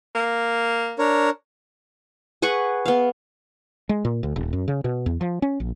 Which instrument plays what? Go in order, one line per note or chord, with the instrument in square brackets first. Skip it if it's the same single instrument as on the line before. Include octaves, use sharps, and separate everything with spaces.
[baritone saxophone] A#3
[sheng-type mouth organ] D4 A#4 C#5
[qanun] G#4 B4 F#5 C#6
B3 F5
[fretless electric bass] G#3
A#2
D2
D#1
F#2
C#3
B2
E2
F3
C#4
A#1